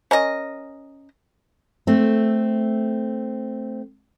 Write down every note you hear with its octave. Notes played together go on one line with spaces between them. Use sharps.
C#4 A#4 D#5
A3 C4